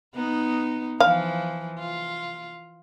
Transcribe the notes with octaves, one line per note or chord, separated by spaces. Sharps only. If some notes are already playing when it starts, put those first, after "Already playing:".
B3 D#4
E3 F3 F5
F4